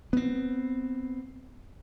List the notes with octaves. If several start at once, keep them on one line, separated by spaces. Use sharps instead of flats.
B3 C4